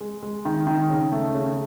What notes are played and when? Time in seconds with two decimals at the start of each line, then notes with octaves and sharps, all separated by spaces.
0.01 G#3
0.23 G#3
0.45 D#3
0.67 D#3
0.90 C#3
1.12 A3
1.34 C#3